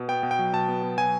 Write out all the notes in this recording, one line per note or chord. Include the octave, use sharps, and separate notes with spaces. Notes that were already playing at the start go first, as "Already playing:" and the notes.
Already playing: B2
B3 G5
B2
G5
F#3
B2 A5
B3
B2
F#3 G#5